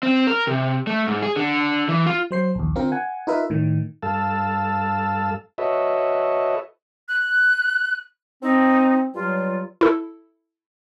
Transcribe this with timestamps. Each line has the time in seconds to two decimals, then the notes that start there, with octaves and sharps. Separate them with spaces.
0.03 C4
0.27 A#4
0.47 C3
0.87 A3
1.07 G#2
1.22 G#4
1.36 D3
1.89 E3
2.06 F4
2.31 F#3 C5 C7
2.55 A#1 D#2
2.75 D3 C4 F4 A#4
2.92 F#5 G#5
3.27 D#4 F4 A#4 B4 E5
3.50 A2 D#3
4.03 G2 A4 F5 A5 E6
5.58 F#4 A4 B4 C#5 D#5 E5
7.09 F#6
8.43 C4 D#4
9.14 G2 F#3 G3 F4
9.81 E4 A4